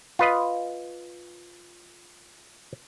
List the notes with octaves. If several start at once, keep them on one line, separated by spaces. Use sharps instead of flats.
F4 B4 D#5